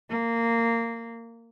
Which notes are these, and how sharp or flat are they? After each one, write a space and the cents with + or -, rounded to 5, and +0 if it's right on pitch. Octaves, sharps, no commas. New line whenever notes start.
A#3 -15